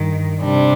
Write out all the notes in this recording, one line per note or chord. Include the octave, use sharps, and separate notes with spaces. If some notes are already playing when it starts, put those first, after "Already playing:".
Already playing: G2 D#3
C3 G3 D4